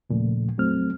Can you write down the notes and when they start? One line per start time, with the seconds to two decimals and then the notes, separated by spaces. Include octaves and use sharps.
0.10 D#2 A#2 C#3 F3 A3
0.58 F2 F#3 A3 C4 F6